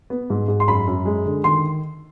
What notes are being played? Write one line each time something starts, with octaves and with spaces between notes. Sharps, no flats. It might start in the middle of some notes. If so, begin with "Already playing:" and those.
B3
G#2
G#2
C6
F#2 B5
F#2
G#3
D3
D#3 C6